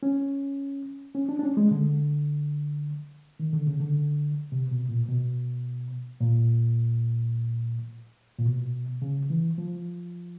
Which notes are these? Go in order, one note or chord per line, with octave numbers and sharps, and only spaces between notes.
C#4
C#4
D4
D4
C#4
G#3
D3
D#3
D3
C#3
D3
C3
B2
A#2
B2
A#2
A#2
B2
C#3
E3
F3